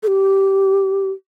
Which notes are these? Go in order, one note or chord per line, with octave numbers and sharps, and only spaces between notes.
A4
G4